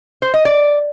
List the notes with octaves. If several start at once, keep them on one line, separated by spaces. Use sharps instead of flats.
C5
D#5
D5